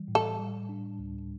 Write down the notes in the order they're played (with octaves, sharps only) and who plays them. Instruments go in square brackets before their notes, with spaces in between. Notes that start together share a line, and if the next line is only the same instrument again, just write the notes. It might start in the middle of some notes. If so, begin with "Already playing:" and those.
Already playing: [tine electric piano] E3 G3
A2
[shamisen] A4
[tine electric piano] G3
D4
D2